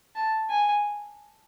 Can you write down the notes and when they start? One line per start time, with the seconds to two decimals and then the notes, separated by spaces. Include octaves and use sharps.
0.15 A5
0.50 G#5